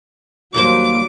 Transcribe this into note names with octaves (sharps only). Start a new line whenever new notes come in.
D#2 F#3 G3 A#3 C5 D6